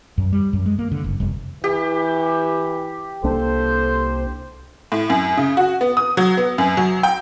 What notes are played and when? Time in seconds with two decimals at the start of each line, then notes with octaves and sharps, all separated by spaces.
0.18 F#2
0.33 G3
0.53 F#2
0.66 G#3
0.79 A#3
0.92 D3
1.04 F#1
1.20 F1
1.64 E3 G4
3.24 C2 A#3 D4 A4 C5
4.92 A2
5.10 F#2
5.37 C#3
5.57 F#4
5.81 B3
5.97 D#6
6.17 F#3
6.37 B3
6.58 F#2
6.77 F#3
7.03 G5